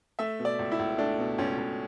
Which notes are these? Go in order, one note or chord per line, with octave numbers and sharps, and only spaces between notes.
A3 E5
B2
D5
C#2
E4
C#2
A3 D4
B2
C#2 C#4
C#2